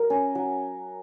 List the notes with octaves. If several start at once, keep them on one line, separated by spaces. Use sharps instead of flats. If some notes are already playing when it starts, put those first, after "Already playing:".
Already playing: F#3 A#4
C#4
F#3